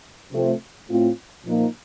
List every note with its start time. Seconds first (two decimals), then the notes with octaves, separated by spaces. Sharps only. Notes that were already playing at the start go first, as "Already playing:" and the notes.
0.32 C3 F3 A3 C4
0.89 A2 A3 C4 F4
1.45 A#2 F3 A#3 D#4